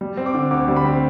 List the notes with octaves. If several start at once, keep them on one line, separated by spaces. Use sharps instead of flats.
G3
C4
D6
D3
D2 D6
G3
B5
C4